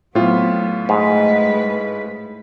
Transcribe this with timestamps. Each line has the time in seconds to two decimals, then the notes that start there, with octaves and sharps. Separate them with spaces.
0.15 A2 F#3 B3 C4 F4
0.89 G#2 G#3 A3 B4